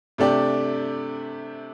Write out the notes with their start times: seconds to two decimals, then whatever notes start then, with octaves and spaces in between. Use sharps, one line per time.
0.18 C3 A3 D4 G4 D5